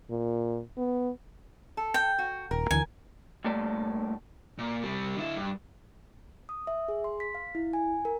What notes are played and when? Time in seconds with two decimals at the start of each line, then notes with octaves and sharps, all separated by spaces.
0.10 A#2
0.77 B3
1.77 A4
1.94 G5
2.18 F#4
2.51 D#1 A#4
2.71 D2 D3 E3 G#5
3.44 G2 A#2 A3 D5
4.58 A#2
4.83 C3 G3
5.17 D3 E4
5.37 G2
6.49 D#6
6.67 E5
6.88 G#4
7.04 C6
7.20 B6
7.35 F5
7.55 E4
7.73 G#5
8.05 A#4